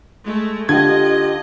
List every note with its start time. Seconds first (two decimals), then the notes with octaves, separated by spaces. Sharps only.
0.24 G#3 A3
0.69 D3 D#4 F4 G4 D#5 G#6